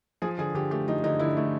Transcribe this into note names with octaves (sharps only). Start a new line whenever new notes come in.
F3 G#4
D3 G#4
D3 G4
A3 G4
F3 D#4
D3 D#4
D3 E4
A3